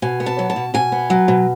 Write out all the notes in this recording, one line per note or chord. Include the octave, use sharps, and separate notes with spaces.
B2 G#5
B3
A5
F#3
A5
B2
B2 G#5
B3
F#3
B2